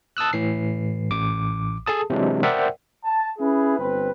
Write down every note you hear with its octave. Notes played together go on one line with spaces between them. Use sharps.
A5 D#6 E6 F#6
A2 E3 C7
A1 D6
G#4 A4 A5 D#6
C3 E3 F#3 G#3 D4
A#4 C5 D5 E5 F#5 G5
A5
C#4 E4 G#4 B4
G1 C4 B4